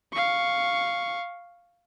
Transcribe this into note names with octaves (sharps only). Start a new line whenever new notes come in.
F5 C#6